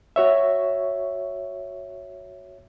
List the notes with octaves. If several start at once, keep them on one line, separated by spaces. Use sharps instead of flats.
F#4 C#5 E5